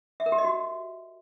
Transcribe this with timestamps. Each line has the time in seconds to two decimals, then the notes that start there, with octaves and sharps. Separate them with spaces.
0.20 E5
0.26 A#4
0.32 G4
0.38 D#5
0.44 F#4